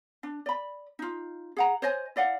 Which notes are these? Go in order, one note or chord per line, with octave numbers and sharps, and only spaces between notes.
D4
D5 B5
D#4 F4
G#4 F#5 A#5
C5 C#5 D#5 G#5
E4 D5 F5 F#5